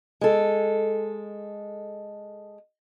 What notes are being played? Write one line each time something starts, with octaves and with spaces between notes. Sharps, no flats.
G#3 A4